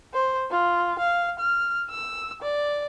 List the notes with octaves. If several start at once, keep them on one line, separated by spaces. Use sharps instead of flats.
C5
F4
F5
F6
E6
D5